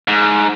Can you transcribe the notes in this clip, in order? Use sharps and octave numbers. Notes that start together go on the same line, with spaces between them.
G#2